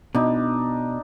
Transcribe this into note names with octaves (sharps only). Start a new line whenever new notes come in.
B2 D4 D#4